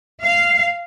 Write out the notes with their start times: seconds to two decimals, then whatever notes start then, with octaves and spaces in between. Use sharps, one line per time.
0.23 F5